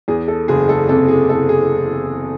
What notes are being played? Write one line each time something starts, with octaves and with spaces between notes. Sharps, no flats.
E2 G#4
A4
F#1 G#4
A4
C3 A4
G#4
C3 A4
G#4